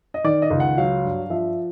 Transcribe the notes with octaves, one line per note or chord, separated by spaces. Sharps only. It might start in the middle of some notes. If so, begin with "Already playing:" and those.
D#5
D#3 D5
D#5
C#2
F#5
F#3 F5
G2
F3 E5